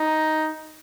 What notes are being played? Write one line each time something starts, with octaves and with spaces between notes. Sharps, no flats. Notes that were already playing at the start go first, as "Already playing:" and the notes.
Already playing: D#4